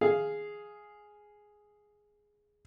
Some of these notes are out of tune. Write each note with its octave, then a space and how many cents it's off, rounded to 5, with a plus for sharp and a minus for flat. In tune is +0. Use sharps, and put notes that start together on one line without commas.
G#4 +0 F5 +0